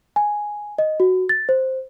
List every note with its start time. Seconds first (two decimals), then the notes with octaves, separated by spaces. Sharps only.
0.16 G#5
0.78 D#5
1.00 F#4
1.29 A6
1.49 C5